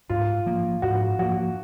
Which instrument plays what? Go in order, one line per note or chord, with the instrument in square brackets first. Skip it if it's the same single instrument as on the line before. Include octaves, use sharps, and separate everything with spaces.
[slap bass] G#2 [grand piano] F4
[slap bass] F3 A#3
[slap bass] G#2 [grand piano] F#4
[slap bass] F3 A#3 [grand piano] F#4